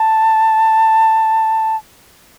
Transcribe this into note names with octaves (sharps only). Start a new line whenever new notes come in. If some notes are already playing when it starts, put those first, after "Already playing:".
Already playing: A5